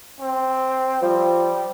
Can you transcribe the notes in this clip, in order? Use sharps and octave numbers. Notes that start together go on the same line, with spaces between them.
C4
F3 G3